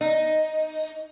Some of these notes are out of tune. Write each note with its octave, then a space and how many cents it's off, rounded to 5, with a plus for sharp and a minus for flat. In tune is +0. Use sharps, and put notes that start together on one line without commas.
D#4 +5